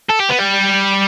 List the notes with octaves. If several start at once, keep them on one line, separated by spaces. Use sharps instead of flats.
A4
G4
B3
G3